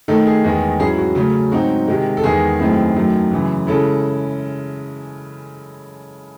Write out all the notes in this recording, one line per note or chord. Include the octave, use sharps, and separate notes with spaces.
D#3 A3 D#4 A4
G#4
E2 D#3 G#3
G#2 F#3 C#4 E4 G#4
F#4
C#3 F#3 A3 C#4
G#2 F#3 C4 D#4 F#4
C3 D#3 G#3
A4
E2 D#3 G#3 G#4
F#2 D#3 A3 C4 E4
F#2 D#3 F#3 A3
F#2 C#3 E3
C#3 G#3 C#4 E4 A4